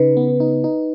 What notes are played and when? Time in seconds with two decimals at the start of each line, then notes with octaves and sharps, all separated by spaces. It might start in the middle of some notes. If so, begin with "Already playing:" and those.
Already playing: C#3 D#4 B4
0.17 B3
0.40 D#4
0.64 D#4